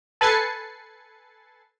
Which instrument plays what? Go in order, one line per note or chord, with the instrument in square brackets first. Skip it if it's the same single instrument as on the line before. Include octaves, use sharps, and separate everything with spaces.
[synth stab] A4 B4 G#5 A6 C7 C#7